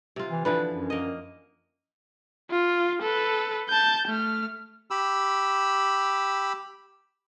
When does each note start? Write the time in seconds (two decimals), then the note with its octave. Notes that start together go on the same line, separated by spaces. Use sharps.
0.16 C3 F4
0.30 E3
0.45 D3 E3 F3 B4
0.70 F#2
0.90 A#3 D#5
2.51 F4
3.02 A4 B4
3.69 A5 G6
4.08 A3 F6
4.91 G4 B5 E6